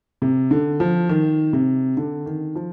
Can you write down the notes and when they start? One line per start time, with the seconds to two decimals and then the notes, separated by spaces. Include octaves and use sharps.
0.22 C3
0.51 D3
0.80 F3
1.09 D#3
1.53 C3
1.97 D3
2.26 D#3
2.55 F3